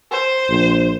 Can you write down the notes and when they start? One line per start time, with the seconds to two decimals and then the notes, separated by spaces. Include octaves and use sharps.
0.12 C5
0.50 A#1